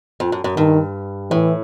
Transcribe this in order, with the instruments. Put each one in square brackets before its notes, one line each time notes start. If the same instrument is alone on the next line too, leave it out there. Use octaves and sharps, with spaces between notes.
[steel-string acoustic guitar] F2
F#2
F#2
[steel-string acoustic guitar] G2 [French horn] D#3
[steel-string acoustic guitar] A2 [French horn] E3